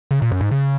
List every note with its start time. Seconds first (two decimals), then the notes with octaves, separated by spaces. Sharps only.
0.11 C#3
0.22 A#2
0.32 F#2
0.41 G#2
0.51 C#3